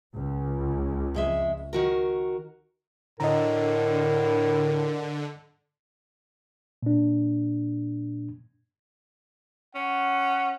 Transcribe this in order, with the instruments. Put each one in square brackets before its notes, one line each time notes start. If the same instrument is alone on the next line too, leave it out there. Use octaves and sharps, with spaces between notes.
[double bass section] C#2
[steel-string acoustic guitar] F2 G#3 E5
D#3 F#4 A#4
[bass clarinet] A2 [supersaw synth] D3 [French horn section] A#4 [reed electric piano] D#5 A#5
[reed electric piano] A#2 D4
[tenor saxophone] C#4 [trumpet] F#5